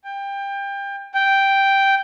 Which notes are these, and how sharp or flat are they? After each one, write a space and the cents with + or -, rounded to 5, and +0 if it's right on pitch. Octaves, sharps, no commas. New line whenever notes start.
G5 +25
G5 +0